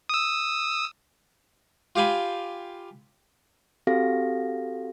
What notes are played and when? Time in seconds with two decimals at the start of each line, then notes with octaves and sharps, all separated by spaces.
0.09 D#6 E6
1.96 F4 G4 F5 G#5 B5
3.87 C4 F#4 G4 A4 F5 A#6